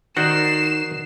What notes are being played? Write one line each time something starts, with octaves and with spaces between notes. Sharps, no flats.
D#3 F#4 C5 D5 C7 E7